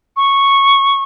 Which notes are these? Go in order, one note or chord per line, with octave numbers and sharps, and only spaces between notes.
C#6